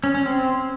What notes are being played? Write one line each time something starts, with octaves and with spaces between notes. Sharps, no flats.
C#4
C#4
C4